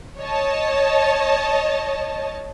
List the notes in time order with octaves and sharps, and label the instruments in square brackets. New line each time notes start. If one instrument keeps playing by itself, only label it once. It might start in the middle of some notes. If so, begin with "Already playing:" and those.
[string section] C#5 D#5 A5